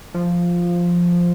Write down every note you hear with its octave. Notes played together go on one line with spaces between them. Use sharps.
F3